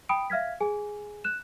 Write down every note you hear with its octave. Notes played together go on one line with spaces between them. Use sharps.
G5 B5 D#6 D7
E5 F5 F6 G#6 B6
G#4 G#5
F#6 E7